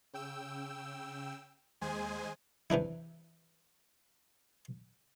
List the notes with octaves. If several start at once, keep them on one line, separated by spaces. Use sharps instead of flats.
C#3 G5 E6
D#2 G#3 G#4 C5 G#5
C3 E3 D4 E4